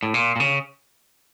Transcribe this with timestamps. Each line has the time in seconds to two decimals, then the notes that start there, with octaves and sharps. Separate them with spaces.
0.03 A2
0.14 A#2
0.36 A#2
0.40 C#3